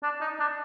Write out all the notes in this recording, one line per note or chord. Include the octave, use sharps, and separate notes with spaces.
D4
D#4
D4